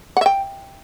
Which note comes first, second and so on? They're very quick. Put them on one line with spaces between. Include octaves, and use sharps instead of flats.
F#5 E5 G5